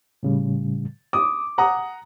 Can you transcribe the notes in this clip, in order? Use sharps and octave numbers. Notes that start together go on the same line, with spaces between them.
A2 C#3 G3
D6 D#6
F#5 A#5 D#6